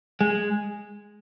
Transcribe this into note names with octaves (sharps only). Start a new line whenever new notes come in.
G#3